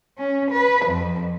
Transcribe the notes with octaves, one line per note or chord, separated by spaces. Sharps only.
C#4
B4
F2